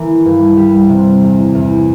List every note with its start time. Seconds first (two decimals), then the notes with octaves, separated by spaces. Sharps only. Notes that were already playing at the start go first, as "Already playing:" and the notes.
Already playing: E3 A#3
0.25 G2
0.57 G3
0.89 C3
1.22 E2
1.55 E2